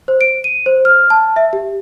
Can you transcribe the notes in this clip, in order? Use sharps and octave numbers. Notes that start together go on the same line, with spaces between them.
C5
D7
D#7
C5
F6
A5
E5
G4